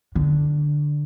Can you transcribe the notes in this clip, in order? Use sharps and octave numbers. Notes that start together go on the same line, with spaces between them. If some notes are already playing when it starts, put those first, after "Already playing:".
D3